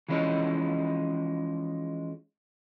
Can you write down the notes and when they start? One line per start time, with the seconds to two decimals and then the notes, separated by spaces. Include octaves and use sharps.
0.08 E3 F3 G#3 C#4 D#4